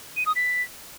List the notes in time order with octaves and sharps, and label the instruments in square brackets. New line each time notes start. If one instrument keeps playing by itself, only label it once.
[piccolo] D#7
D#6
B6